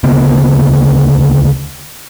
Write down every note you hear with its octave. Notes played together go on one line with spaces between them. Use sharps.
D2 C#3 A#3 B3